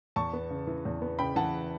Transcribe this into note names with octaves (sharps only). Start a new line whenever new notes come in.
E2 A5 C#6
B3
C#3
E3
E2
B3
C#3 G5 B5
E3 F#5 A5